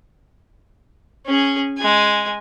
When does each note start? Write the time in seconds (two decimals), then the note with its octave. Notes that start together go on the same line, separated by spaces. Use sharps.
1.26 C#4 G#4
1.78 G#3 G#5